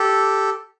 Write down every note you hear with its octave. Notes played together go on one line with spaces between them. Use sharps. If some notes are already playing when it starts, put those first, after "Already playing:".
Already playing: G4 A4